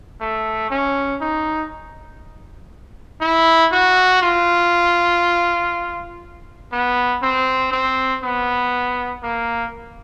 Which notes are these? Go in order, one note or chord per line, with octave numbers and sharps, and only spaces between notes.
A3
C#4
D#4
E4
F#4
F4
B3
C4
C4
B3
A#3